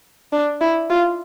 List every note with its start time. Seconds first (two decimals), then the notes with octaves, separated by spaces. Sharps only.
0.32 D4
0.61 E4
0.90 F4